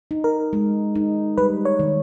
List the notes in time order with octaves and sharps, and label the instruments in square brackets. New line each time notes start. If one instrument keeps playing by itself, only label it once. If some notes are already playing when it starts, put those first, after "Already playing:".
[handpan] D#4
[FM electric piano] A#4
[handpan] G#3
D#4
[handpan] G3 [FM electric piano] B4
[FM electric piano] C#5
[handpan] D#3